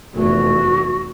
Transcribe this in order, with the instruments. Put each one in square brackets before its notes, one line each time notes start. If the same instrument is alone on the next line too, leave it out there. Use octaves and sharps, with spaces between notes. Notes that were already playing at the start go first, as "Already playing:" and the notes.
[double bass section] F1 E2 A3 [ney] F#4